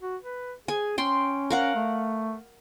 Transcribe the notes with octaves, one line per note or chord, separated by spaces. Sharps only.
F#4
B4
G#4 G#5
C#4 G5 C6
A#4 F5 F#5
A3